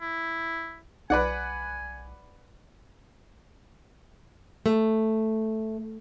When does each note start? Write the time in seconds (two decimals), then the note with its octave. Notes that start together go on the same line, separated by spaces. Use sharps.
0.01 E4
1.10 B1 B4 D5 F#5 G#5
4.66 A3